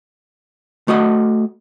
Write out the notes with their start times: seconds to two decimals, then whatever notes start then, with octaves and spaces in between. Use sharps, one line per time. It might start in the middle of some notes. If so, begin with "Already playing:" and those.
0.88 A3 F#4 D#5 F#5